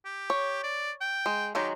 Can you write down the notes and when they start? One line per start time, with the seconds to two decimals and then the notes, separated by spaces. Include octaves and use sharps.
0.05 G4
0.30 C#5
0.63 D5
1.01 G5
1.26 G#3
1.55 D#3 F#3 G#3 G4